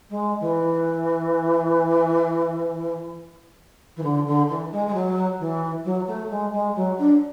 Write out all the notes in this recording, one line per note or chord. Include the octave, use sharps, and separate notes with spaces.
G#3
E3
E3
D3
D3
E3
G#3
G#3
F#3
E3
F#3
A3
G#3
G#3
F#3
D4